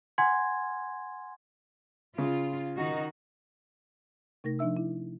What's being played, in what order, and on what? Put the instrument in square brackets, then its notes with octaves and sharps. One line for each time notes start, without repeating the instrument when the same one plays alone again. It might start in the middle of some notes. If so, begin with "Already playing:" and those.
[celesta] F#5 G#5 C6 G#6
[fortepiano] C#3 [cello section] F4
[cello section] D#3 D#4 F#4
[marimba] C3 A3 D#4 A#4 A#6
F3 D4 D#4 E5 E6
E4